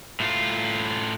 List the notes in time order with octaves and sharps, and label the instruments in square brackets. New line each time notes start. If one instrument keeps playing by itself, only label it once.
[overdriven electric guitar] A2 F4